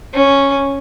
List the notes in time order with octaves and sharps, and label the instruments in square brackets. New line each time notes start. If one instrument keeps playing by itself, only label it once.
[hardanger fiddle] C#4